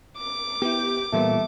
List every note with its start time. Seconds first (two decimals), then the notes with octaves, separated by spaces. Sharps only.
0.19 D6
0.62 B3 E4 G4
1.12 A#2 E3 G3 A3 B3